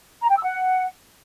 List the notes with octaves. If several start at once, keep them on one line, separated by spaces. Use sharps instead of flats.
A#5
G5
E6
F#5